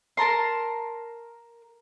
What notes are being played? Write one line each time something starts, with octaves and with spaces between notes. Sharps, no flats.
A#4 A5 A#5 C6